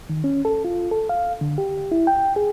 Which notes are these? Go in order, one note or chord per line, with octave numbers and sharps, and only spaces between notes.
D#3
C#4
A4
F4
A4
F5
D3
G4
E4
G5
G#4